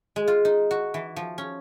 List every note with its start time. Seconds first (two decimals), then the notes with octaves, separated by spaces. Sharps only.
0.16 G#3
0.28 F4
0.45 D#4
0.71 F#4
0.94 E3
1.16 F3
1.38 C#4